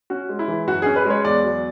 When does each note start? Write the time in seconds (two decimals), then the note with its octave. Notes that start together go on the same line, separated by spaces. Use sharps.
0.10 C#4 F#4
0.29 G#3
0.39 E4
0.48 E3
0.67 F#2 F#4
0.82 C#4 G#4
0.96 B4
1.05 G#3 C#5
1.25 E2 D5
1.44 F#3